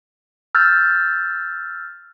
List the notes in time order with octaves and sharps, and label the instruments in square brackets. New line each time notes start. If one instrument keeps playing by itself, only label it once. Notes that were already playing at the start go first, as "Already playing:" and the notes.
[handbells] E6 F6 G6 A6